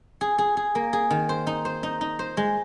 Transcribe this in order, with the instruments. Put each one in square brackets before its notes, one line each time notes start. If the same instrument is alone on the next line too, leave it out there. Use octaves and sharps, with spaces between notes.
[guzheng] G#4
G#4
G#4
A#3
G#4
D#3
C5
D#4
C5
D#4
D#4
C5
G#3